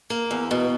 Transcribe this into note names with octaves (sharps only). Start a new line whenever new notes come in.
A#3
E2
B2